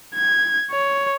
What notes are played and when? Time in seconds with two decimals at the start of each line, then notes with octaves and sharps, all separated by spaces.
0.15 G#6
0.72 C#5